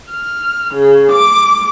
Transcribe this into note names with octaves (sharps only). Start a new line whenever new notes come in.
F6
C#3
D6